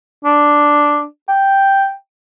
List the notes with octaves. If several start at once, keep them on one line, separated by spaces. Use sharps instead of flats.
D4
G5